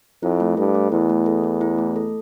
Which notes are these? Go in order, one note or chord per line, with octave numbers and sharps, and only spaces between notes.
F2 E4
A3
G2 A4
A3
E2 E4
A3
A4
A3
E4
A3
A4